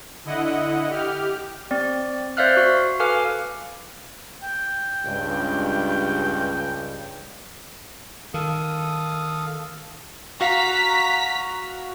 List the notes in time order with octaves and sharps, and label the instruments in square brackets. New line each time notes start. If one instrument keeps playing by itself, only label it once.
[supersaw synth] D3 E4 D#5 F#5
G4 F6
[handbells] C4 D5
C5 D5 E5 F5 F6 F#6
F#4 F5
A4 B4 F5 G#5 D6 F6
[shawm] G5
[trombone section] C#2 G2
[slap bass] D#3 [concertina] A4 F5 D#6
[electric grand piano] F#4 F5 [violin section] A#5 B6